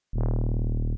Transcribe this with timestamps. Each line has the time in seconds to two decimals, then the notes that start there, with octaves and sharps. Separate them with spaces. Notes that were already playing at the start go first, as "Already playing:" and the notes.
0.13 D#1